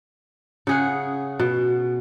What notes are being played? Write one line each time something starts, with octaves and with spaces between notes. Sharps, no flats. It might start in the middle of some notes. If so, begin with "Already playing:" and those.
C#3 G#4 F#5
B2